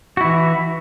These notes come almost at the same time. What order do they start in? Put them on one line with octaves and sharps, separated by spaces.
F#4 E4 E3